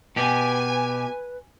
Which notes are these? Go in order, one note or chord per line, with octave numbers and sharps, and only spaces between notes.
B2 G4 B4 G#5